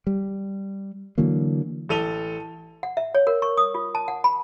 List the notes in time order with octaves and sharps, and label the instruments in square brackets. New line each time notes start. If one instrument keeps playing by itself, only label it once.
[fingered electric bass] G3
D3 E3 F#3 A#3
[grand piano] A1 A4 D#7 F7 G7
[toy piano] F#5
E5
C#5
A#4
C#6
D#6
F4
A5
F#5
B5